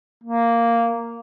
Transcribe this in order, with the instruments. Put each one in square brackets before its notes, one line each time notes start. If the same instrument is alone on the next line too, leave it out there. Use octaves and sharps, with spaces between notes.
[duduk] A#3